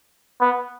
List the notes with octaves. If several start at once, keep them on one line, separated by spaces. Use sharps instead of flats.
B3